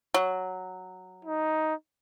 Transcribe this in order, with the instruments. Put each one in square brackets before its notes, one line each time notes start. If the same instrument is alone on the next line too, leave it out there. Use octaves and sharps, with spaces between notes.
[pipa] F#3
[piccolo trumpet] D#4